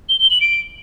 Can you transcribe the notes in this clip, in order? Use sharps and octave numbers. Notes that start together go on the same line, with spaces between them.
G7
G7
F#7
D7